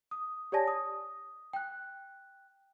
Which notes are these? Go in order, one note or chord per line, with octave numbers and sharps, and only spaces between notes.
D#6
G4 C#5 D5 G#5 A5 A#6
D#6
G5 F#6